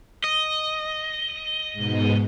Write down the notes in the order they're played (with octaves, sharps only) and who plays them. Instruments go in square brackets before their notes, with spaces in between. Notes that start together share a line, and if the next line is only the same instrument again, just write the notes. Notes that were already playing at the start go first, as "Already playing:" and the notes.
[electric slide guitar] D#5
[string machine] G#2 B2